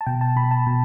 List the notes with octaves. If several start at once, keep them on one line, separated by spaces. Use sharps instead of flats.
A5
B2 G5
A5
B2 B5
A5
B2